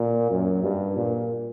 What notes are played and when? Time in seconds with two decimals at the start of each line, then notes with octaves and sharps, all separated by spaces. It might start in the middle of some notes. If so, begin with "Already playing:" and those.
Already playing: A#2
0.30 F#2
0.63 G2
0.96 A#2